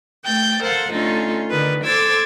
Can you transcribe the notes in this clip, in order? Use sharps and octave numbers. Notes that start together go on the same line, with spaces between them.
A3 G5 G6 A6
A4 A#4 C5 F5 F#5
D3 A3 C#4 D#4 F4
D3 D#3 B4
A4 C5 D6 E6 G#6 A6